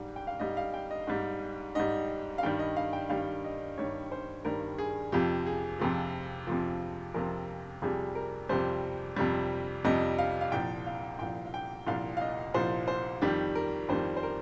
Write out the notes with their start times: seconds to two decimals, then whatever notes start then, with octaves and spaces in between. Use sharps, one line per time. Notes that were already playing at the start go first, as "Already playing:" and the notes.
Already playing: G#2 G3
0.16 G5
0.27 F5
0.40 G#2 G3 D#5
0.57 F5
0.74 G5
0.91 D#5
1.07 G#2 G3
1.75 G#2 G3 D#5
2.38 F5
2.43 G2 D#3 G3 G5
2.59 D#5
2.76 F5
2.93 G5
3.09 G2 D#3 G3 F5
3.44 D#5
3.78 G2 D#3 G3 C#5
4.12 C5
4.45 G2 D#3 G3 A#4
4.78 G#4
5.12 F2 C3 F3 G4
5.46 G#4
5.80 F2 C3 F3
6.47 F2 C3 F3
7.14 F2 C3 F3 A#4
7.82 F2 C3 G3 G#4
8.15 A#4
8.49 F2 C3 G3 C5
9.17 F2 C3 G3
9.84 F2 C3 G3 D#5
10.19 F5
10.41 F5
10.52 C2 A#2 F3 G5
10.86 F5
11.19 C2 A#2 F3 G5
11.46 F5
11.54 G5
11.87 C2 A#2 F3 F5
12.17 F5
12.21 D#5
12.54 C2 A#2 F3 C5
12.88 C5
13.22 F2 D#3 G3 G4
13.55 A#4
13.89 F2 D#3 G3 C5
14.17 C5
14.23 A#4